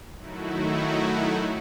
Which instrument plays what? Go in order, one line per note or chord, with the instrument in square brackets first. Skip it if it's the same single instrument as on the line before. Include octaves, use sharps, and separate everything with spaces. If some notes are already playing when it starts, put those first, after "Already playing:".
[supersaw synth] D#3 F#3 A3 D#4 E4 F#4